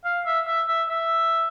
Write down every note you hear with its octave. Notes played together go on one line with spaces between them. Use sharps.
F5
E5
E5
E5
E5